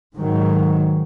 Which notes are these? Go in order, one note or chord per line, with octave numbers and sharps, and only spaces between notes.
G#2 D#3 F#3